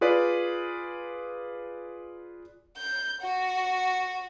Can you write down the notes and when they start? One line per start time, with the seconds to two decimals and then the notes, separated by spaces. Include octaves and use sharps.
0.01 F4 G#4 B4 D5
2.77 G6
3.21 F#4